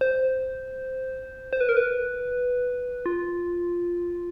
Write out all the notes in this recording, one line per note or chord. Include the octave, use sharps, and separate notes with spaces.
C5
C5
B4
A#4
B4
F4